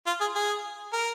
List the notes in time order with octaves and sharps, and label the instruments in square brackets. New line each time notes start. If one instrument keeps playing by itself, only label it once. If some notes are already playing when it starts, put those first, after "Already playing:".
[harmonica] F4
G#4
G#4
A#4